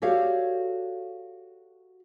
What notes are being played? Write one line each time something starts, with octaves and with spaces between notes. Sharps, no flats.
F#4 G4 A4 C#5 D5 F5